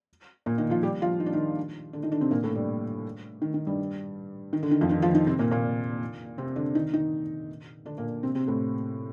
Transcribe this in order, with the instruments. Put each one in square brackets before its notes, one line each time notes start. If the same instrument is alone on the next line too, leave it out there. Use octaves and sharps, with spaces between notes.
[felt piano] A#2 A#3
D#3 D#4
F3 F4
G3 G4
F3 F4
D#4
D4
D#3 D#4
D3 D4
D#3 D#4
D3 D4
C3 C4
A#2 A#3
A2 A3
G2 G3
D#3
D#3
G2 G3
D#3
D3
D#3
F2 F3
D#3 D#4
F3 F4
D#3 D#4
C3 C4
A#2 A#3
A#2 A#3
C3 C4
D3 D4
D#3 D#4
D#3 D#4
D3 D4
A#2 A#3
C3 C4
C3 C4
A2 A3